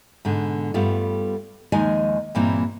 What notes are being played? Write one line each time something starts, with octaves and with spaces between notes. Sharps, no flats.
G#2 B2 D3
G2 G3 A3 B3 F4
D#2 D#3 F3 G#3 D#5 G#5
G2 A#2 E3 A#3 C4